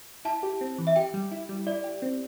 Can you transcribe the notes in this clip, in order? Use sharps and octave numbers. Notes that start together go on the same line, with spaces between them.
E4 A5
G4
C4
E3
E5
G4 G5
G3
E4
G3
E4 D5
G4
C4